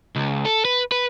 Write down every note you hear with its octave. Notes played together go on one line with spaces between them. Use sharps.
C#2
A4
B4
B4